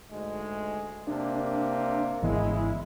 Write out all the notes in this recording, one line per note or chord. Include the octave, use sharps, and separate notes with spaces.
D2 G#2 G#3
C3 A#3 D4
G#1 C#3 E3 G#3 B3 E4